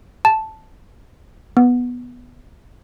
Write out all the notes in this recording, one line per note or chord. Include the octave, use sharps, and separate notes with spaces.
A5
B3